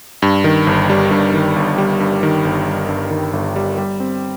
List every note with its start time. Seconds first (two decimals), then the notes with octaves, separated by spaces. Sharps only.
0.22 G2
0.44 D#3
0.67 G1
0.90 G3
1.11 G2
1.34 D#3
1.56 G1
1.78 G3
2.00 G2
2.23 D#3
2.45 G1
2.67 G3
2.89 G2
3.11 D#3
3.33 G1
3.56 G3
3.78 G3
4.00 C4